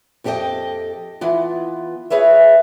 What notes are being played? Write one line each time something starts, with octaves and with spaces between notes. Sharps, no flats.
F2 C#4 G4 A4 D#5 G5
E3 B3 F4
G#4 B4 C#5 E5